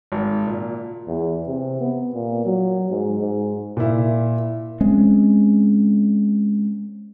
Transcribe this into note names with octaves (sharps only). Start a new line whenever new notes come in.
G#1
A#2
E2
C3
B3
A#2
F#3
G#2
G#2
A#2 E4
G#3 C4 C#4